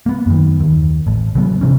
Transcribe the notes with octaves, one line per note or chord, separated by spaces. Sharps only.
A#3 B3
F#2 D#3
D#2
A1
C#3 F#3 B3
C3 E3 C#4